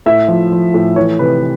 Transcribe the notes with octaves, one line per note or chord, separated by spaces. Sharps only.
A2 E5
F3
F3
A2
E3 C#5
C3 B4